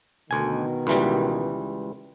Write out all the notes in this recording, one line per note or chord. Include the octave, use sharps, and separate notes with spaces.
D2 B2 D#3 G#5
C#2 E3 G3